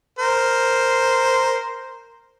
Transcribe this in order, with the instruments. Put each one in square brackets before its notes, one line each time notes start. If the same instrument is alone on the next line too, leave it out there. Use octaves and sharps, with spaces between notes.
[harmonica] A#4 C5